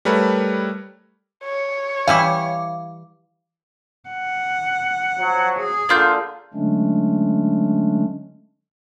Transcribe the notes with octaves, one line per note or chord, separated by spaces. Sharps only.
G3 A3 A#4 B4 C#5
C#5
E3 G3 E4 F5 D6
F#5
F3 F#3
G#4
D3 A#3 D4 F4 G6
D3 F#3 G#3 A3 C#4 D4